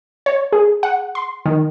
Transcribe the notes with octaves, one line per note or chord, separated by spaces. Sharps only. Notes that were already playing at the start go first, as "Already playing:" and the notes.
C#5
G#4
F#5
C6
D#3